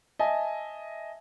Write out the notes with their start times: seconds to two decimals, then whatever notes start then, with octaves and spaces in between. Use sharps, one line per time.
0.19 D#5 E5 G#5 A5